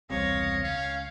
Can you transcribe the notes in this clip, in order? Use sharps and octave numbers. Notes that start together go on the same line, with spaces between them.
E1 C2 C3 C#5 D#5 F5
C#2 C#4 F5